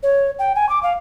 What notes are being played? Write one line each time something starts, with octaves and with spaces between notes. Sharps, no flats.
C#5
G5
G#5
D6
F5